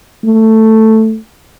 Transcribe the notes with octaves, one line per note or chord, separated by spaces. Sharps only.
A3